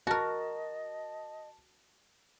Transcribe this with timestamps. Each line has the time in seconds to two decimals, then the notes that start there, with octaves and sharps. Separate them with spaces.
0.07 F#4 A#4 D#5 A5